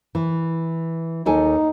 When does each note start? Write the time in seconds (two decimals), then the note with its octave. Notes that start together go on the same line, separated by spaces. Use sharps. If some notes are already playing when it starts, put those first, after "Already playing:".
0.15 E3
1.26 D#2 D#4 A4 G#5